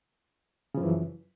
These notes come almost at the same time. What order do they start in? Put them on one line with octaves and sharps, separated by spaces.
C#3 F3 F#2 E3